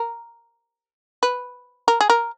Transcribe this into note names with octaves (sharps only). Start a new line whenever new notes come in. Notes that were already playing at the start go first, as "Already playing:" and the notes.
Already playing: A#4
B4
A#4
G#4
A#4